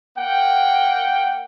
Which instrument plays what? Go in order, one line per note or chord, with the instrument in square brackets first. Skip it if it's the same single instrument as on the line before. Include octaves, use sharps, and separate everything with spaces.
[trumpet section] A#3 F#5 G5